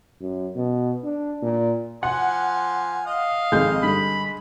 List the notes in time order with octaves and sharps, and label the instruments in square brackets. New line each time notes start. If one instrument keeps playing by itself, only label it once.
[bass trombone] F#2
B2
D4
A#2
[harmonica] F3 G#5 C6 [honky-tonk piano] F#5
[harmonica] D#5 [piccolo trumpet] F5
[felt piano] G#1 F2 G6 [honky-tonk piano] G#3
[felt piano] G2 D3 [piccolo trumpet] B5